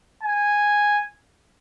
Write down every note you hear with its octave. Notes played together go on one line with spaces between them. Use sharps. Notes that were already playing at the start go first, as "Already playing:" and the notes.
G#5